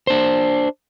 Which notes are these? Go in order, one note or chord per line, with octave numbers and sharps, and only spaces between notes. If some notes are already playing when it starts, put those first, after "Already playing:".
D4 C5